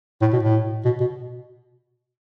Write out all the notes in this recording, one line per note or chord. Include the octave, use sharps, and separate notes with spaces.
A2
B2
A2
B2
B2